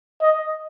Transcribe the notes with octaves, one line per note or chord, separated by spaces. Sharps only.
D#5